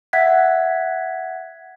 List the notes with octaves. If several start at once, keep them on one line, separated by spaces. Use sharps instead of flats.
E5 F#5 F#6 G#6 B6